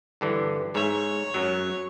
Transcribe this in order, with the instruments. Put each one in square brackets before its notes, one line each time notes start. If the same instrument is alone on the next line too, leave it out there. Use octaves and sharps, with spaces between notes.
[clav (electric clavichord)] G2 D3 E3
[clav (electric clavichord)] G#2 E5 [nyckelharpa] C#5
[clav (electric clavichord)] F#2 F#3